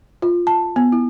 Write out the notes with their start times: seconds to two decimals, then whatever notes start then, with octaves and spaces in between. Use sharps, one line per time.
0.22 F4
0.47 A5
0.76 B3
0.92 E4